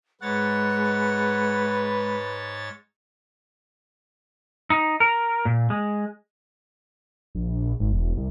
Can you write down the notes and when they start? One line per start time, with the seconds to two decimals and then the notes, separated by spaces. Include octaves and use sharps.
0.22 G#2 G#3 B4 C#5 F#5 A6
4.70 D#4
5.00 A#4
5.45 A#2
5.70 G#3
7.35 A#1
7.80 G#1
7.92 E1
8.16 C2